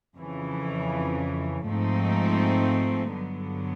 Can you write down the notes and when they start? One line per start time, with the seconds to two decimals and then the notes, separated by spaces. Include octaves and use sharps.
0.15 F2 C#3 E3
1.65 G#2 F3 A3 C4 D#4
3.13 G2 D3 F#3 B3